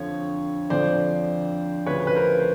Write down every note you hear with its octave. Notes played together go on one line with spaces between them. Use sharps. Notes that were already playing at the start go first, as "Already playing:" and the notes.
Already playing: F2 D3 F3 C#5
F2 D3 F3 C5 D5
D2 C#3 F3 B4 C#5
B4
A#4 C5
C5